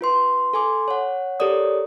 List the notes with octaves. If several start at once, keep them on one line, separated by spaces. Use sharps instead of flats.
F4 B4 C6
A4 G#5 C6 D6
C#5 F#5
G4 A4 A#4 C#5 D5 D#6